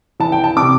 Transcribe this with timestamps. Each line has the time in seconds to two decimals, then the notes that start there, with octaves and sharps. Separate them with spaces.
0.20 E3 A5
0.32 G5
0.44 A5
0.57 C3 D6